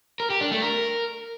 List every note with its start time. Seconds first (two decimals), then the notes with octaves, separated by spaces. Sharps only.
0.20 A#4
0.30 G4
0.41 D4
0.51 A3
0.62 A#4